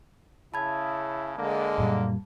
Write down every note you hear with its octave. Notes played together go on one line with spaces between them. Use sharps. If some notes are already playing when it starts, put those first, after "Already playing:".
C#3 E4 A5 B5 G#6
D3 G#3 A#3
F#2 A#2 G3